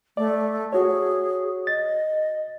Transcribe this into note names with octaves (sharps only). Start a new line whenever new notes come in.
A3 D5
F#4 G#4 C#5
D#5 A6